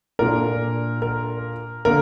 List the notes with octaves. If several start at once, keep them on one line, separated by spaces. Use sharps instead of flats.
A#2 A#3 D4 A#4
A#4
D3 A#3 A#4